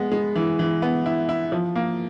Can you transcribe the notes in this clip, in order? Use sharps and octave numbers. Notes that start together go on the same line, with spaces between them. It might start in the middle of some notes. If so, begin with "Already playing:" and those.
Already playing: G#3 B3
G#3
E3
E3
B3
E4
E4
F3
A#3